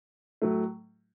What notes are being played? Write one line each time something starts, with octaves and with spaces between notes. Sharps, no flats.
A2 F#3 A3